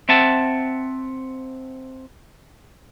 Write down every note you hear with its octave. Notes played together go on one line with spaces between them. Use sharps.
C4 E5 F#5 A5